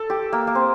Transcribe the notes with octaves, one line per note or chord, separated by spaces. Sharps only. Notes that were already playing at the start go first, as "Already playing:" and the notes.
Already playing: A4
G4
A#3
A#3
C4